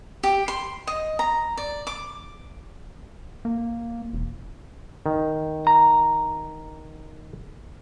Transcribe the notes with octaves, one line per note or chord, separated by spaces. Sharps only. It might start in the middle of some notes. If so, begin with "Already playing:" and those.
G4
C6
D#5
A#5
D5
D6
A#3
E1
D#3
A#5